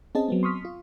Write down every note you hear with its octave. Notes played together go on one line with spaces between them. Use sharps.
C4 C#4 G#4 D#5 A5
F#3 B3 C4
C6 C#6 D#6 F6 B6
F4